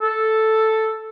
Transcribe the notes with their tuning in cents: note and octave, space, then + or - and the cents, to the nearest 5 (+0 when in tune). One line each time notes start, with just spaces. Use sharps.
A4 +0